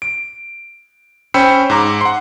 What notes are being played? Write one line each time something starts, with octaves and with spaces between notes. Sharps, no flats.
D7
C#4 C5 G5 B5 E6 C#7
G#2 A#5 D6
F#5 C6